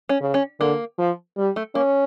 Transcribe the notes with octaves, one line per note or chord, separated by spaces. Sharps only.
C#4
C#3
C#4
D3 A#3
F3
G3
A3
A#3 C#4